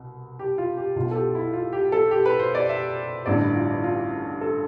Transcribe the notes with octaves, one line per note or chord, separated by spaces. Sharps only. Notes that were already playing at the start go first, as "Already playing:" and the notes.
Already playing: C2 B2
G4
F4
G4
B1 B2 F4
A4
G4
E4
F4
G4
A4
G4
B4
C5
D5
E5
A1 G2 D3 D5
E4
F4
E4
F4
A4